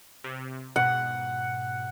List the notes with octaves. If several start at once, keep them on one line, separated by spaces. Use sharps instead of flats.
C3
G#2 B2 F#5